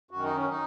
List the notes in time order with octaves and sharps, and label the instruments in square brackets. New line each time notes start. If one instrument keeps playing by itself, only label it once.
[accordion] F#2 D#3 F#4
D#4
C#4
D#4